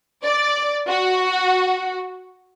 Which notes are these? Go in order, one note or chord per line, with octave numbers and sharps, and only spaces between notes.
D5
F#4